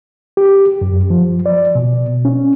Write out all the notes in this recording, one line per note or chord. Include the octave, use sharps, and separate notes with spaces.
G4
F#2
F3
D5
B2
C#4